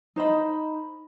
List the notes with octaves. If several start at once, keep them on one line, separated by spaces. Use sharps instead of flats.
D#4 C5 D#5 B5